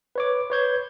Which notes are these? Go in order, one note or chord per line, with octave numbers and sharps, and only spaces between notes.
B4 C#5 D6
B4 C#5 G6 G#6